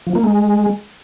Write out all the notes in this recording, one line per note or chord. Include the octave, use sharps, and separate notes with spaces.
F3
A#3
G#3